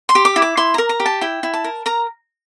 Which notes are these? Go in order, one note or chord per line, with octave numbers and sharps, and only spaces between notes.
C6
G4
D6
E4
D6
E4 C6
A#4 A#5
A#5
G4
A5
E4 G5
E4
A5
A#4
A#4 A#5